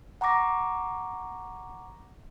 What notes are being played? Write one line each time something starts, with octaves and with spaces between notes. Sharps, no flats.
F#5 A#5 C#6 D6 A#6